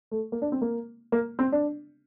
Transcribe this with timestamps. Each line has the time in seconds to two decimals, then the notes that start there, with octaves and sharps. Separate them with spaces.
0.11 A3
0.32 A#3
0.42 D4
0.52 C4
0.62 A#3
1.12 A#3
1.39 C4
1.52 D4